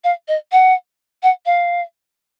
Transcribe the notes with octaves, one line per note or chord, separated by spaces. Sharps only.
F5
D#5
F#5
F#5
F5